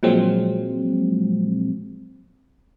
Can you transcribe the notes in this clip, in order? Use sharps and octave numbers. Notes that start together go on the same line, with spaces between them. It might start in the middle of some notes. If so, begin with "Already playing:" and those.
A#2 F3 F#3 G#3 C4